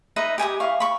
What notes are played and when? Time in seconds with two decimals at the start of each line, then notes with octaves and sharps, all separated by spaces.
0.16 D#4 B4 D#5 E5
0.38 G4 G#5 A#5 D#6
0.60 E4 F5 C#6
0.80 B5 C#6